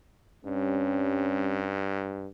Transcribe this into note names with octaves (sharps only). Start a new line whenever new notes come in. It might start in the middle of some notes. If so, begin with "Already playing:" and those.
G2 G3 C4 C#4